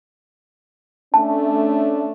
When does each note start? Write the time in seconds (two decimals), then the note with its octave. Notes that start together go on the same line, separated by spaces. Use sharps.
1.14 A3 C#4 D4 A5